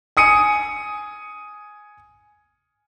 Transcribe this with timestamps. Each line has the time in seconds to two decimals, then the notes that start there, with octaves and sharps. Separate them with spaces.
0.17 G#5 D#6 C#7 D#7